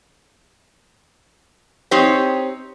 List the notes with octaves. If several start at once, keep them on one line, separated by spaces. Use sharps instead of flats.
C4 D#4 G4 C#5